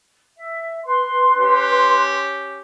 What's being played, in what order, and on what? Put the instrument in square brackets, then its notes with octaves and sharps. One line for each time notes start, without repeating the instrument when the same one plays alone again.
[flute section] E5
B4 C6
[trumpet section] C#4 G4